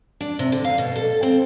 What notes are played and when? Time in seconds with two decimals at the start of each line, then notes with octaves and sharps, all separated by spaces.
0.21 D4
0.39 C3
0.52 D3
0.64 F5
0.78 B2
0.96 A4
1.23 C4